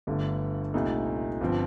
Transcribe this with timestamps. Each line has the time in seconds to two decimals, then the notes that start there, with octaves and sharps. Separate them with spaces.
0.07 G1 G2 D3 A3
0.74 C2 A#2 A3 D#4
1.41 G1 F3 C4